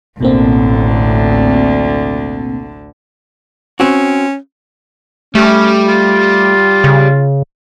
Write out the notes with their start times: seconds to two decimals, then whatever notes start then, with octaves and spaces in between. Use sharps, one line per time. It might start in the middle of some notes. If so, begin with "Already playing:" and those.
0.21 A1 D2 B2 D3 A#3 C4
3.80 C4 C#4 F#4
5.35 G3 A3 C#4
5.88 F4
6.84 C#3